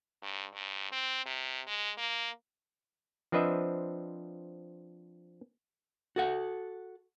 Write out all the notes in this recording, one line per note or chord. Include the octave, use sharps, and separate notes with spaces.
G2
G2
C4
C3
G#3
A#3
F3 C4 D4 B4 D#5 E5
F#4 A4 F#5